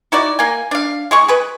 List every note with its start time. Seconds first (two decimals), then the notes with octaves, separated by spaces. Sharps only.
0.12 D#4 E4 F#4 D5
0.39 A#3 G#5
0.71 D4 F5
1.11 G#3 G#4 C#6
1.28 G#4 B4